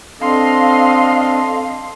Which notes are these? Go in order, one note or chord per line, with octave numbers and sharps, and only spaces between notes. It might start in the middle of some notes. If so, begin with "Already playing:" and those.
C4 D4 A4 D#5 F5 C6